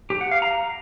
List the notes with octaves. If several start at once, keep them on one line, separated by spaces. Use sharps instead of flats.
G4
F#5
F5
A#5